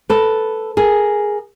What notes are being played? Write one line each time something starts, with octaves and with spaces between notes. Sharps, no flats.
A4 B4
G#4 A#4